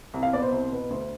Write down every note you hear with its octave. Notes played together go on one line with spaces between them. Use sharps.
C2
F5
B2 B3 D5
C5
C2
B2 B3
D2